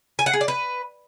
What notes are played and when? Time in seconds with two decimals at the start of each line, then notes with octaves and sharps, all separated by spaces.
0.19 G#5
0.26 F#5
0.33 G#4
0.41 D5
0.48 B4